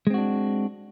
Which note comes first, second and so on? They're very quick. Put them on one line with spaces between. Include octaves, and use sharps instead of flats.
G#3 C4 F#4 D4